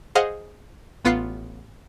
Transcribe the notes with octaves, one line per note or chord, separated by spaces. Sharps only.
G#4 C5 D#5 F5 F#5
A1 B3 F4 B5 F#6 C7